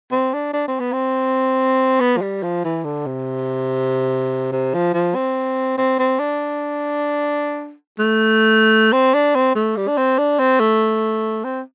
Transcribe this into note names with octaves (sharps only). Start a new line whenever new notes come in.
C4
D4
D4
C4
B3
C4
B3
F3
G3
F3
E3
D3
C3
C3
F3
F3
C4
C4
C4
D4
A3
C4
D4
C4
A3
G3
D4
C4
D4
C4
A3
C4